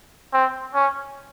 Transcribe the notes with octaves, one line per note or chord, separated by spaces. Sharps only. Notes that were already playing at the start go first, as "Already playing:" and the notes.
C4
C#4